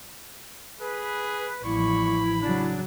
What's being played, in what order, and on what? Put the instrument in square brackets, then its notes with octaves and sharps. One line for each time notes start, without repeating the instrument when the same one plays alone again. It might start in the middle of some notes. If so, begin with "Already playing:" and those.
[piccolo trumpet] G#4 [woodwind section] B4
[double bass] A1 F3 [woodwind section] G3 A#3 C#6 [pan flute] E4 [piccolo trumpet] B5
[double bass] C#3 F#3 [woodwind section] D4